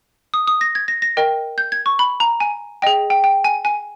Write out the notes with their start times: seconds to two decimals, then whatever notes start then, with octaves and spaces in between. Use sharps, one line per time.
0.34 D#6
0.47 D#6
0.61 A#6
0.75 G#6
0.88 A#6
1.02 A#6
1.17 A#4 D#5 G5
1.58 G6
1.72 G#6
1.86 C#6
1.99 B5
2.20 A#5
2.40 G#5
2.82 G#4 D#5 G5
3.10 G5
3.24 G5
3.44 G#5
3.65 G#5